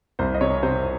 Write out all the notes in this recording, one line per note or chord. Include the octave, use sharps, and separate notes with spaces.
C2 C5
D#5
C3 C#5
C3 C5